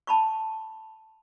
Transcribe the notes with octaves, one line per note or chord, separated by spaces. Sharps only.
A5 B5 C#6